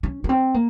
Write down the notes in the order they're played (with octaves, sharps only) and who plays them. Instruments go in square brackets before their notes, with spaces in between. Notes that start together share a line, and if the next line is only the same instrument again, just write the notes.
[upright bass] C#4
A#3
C4
A#3